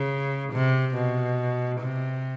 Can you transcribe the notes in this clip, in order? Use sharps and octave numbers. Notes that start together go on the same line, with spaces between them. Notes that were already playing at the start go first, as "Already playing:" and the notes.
Already playing: C#3
C3
B2
C3